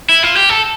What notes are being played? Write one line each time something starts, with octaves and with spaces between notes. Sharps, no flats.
E4
F4
G4
A4